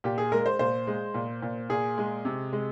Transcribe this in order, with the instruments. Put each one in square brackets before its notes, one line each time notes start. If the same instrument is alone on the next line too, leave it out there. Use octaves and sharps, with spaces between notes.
[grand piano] A#2 G4
G#4
G#3 A#4
C5
A#2 C5
G#3
A#2
A#2
A#2 G#4
G#3
C3
G#3